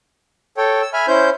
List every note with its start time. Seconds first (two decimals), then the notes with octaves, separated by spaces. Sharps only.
0.57 A4 C#5 G5
0.82 E6
0.93 E5 G#5 B5 F6
1.08 C#4 E4 C5 G6